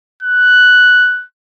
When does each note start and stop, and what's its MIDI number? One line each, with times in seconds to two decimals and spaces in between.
0.22 1.24 90